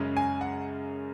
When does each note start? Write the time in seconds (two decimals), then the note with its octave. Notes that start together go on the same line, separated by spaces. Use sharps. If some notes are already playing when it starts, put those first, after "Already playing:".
Already playing: F#2 C#3 G#3 C#4
0.17 G#5
0.41 F#5